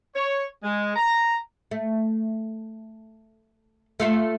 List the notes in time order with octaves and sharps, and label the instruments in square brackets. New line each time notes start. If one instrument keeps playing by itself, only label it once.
[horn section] C#5
G#3
A#5
[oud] A3
A3 F4 A4